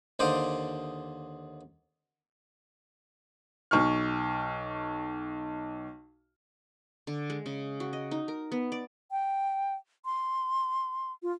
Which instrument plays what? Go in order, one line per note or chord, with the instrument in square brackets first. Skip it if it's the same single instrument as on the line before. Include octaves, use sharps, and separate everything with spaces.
[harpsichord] D#2 D3 C5 D5 D#5 F5
[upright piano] B1 C#6 F6
[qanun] D3
G#3
C#3
F#4
D#5
D#4
A#4
B3
D5
[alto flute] G5
C6
F4